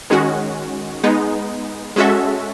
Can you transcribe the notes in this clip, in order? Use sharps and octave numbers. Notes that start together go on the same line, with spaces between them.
D#3 G#3 C#4 F#4
G#3 B3 D#4
G#3 C#4 F#4 A4 E5